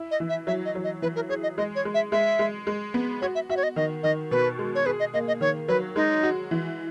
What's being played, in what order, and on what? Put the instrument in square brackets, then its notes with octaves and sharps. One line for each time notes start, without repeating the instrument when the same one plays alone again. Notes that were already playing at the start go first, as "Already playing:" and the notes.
Already playing: [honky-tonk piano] E4
[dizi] D#5
[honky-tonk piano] E3
[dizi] E5
[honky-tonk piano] F#3 [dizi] E5
[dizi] D#5
[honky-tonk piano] F#3
[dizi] D#5
[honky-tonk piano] E3 [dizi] B4
[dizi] A#4
[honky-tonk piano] G#4 [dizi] C#5
[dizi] D#5
[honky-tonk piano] G#3 [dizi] D#5
[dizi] C#5
[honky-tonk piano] G#3
[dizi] E5
[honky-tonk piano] G#3 [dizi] E5
[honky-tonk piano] G#3
G#3
B3
[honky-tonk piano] F#4 [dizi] C#5
[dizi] E5
[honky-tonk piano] F#4 [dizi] E5
[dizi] C#5
D#5
[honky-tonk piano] D#3 [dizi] D#5
[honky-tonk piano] D#3 [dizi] D#5
[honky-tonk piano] B2 [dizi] B4
[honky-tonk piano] G#3
[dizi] C#5
[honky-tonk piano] G#4 [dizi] B4
[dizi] D#5
[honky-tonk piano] A#3 [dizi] D#5
[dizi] D#5
[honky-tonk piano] D#3 [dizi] C#5
[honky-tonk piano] F#3 [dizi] B4
[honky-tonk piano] G#3 [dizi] D#4
[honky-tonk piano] F#4
E3